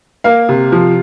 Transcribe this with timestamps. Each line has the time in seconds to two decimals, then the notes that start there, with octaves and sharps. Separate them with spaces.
0.24 A#3 F5
0.49 C3
0.72 F3